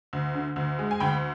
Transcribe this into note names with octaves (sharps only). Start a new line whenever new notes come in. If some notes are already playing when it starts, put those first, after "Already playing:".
D2
D3
D2
G#3
G#5
D2 G5 B5